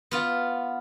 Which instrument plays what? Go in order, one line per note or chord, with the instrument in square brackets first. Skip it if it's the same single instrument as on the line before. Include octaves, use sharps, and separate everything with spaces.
[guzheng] B3 F4